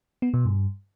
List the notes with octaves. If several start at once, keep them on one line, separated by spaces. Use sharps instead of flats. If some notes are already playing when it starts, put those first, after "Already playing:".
B3
B2
G2